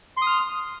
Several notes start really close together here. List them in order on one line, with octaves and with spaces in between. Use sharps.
C6 D#6 F6